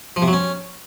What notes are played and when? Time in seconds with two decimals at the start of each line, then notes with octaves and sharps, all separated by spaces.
0.16 F3
0.22 C3
0.27 F#3
0.33 C#4